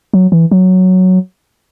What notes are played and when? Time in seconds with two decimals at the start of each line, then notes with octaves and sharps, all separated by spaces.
0.14 F#3
0.32 E3
0.51 F#3